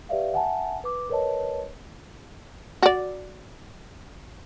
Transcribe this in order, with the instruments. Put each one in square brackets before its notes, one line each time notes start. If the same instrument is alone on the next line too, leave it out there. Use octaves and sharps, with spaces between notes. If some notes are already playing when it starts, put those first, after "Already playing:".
[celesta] G4 B4 D5 E5 F5
E5 F#5 G#5 A5
B4 D6
A#4 B4 C#5 D#5 A5
[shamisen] F#4 D5